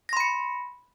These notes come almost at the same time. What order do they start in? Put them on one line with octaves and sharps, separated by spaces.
A#6 C6 B5 C#7